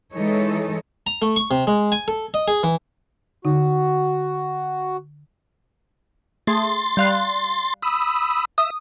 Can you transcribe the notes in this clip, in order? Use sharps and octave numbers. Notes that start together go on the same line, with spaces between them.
E3 G#3 D#4 A4 C#5
A#5
A3
C#6
C3
G#3
G#5
A4
D#5
G#4
E3
D3 D#4 F#4
A3 G#4 C6 A6
G3 F5 F#6
B5 D#6 E6
E5 D#6